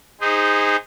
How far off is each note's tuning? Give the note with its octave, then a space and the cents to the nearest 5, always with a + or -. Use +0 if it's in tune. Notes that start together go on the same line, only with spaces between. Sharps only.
D#4 +0 G#4 -25 C5 -20